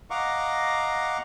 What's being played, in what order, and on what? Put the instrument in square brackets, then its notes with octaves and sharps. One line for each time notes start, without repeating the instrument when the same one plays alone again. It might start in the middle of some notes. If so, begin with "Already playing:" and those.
[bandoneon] D#5 F5 F#5 A#5 C#6 D6